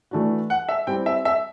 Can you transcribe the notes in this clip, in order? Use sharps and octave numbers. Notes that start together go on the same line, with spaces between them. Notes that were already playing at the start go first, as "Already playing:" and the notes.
E3 A3 D4 F#4
F#5
E5
G3 C4 E4 G4 G5
E5
E5